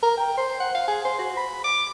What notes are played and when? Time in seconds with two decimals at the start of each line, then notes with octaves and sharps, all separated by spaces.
0.03 A#4
0.17 G5
0.37 C5
0.60 F#5
0.75 F5
0.88 G#4
1.05 C5
1.19 F#4
1.37 B5
1.64 D6